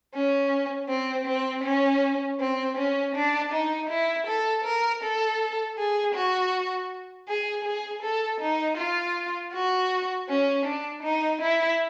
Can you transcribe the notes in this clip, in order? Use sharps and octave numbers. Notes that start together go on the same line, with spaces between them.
C#4
C4
C4
C#4
C4
C#4
D4
D#4
E4
A4
A#4
A4
G#4
F#4
G#4
G#4
A4
D#4
F4
F#4
C#4
D4
D#4
E4